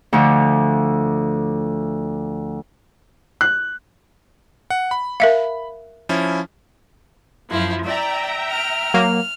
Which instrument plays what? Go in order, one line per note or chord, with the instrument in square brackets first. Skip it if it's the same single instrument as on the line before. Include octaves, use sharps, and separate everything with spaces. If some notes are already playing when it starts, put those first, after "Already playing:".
[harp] D2 D3 F3
[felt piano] F#6
[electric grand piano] F#5
B5
[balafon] A#4 E5 F5
[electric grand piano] F3 C#4 E4
[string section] F#2 F3 [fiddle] E4
[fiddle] D5 [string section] E5 G5 A#5
[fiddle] F6
[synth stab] F#3 A#3